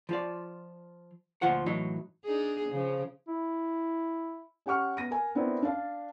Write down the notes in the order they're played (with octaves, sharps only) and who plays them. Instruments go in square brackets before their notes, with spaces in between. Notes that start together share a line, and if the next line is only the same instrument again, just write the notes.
[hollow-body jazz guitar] F3 F4 D5
D2 A#2 F3 F4 F#5
A2 E3 F#3 D#4
[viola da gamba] D4 D#4 G#4
C#3 F3
[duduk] E4
[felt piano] C#4 G4 F#5 C#6 F6
B3 A#6 D#7
A#4 G#5
B3 C4 D4 E4 A#4
D4 D5 F5 A5